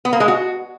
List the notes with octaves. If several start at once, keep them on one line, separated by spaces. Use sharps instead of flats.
B3
A#3
G#3
F#4